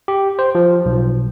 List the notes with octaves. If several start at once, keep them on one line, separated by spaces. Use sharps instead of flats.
G4
C5
F3
B1